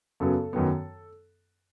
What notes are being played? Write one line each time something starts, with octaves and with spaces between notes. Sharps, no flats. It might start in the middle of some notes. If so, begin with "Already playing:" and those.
F#2 C#3 F#3 B3 A4
F#2 D#3 F#3 B3